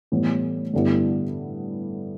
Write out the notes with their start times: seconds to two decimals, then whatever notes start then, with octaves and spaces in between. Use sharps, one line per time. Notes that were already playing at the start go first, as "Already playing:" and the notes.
0.12 A2 E3 G3 B3
0.74 G2 D3 G3 B3 E4